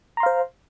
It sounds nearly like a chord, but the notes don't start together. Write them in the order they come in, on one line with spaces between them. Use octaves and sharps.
A#5 C6 F5 C5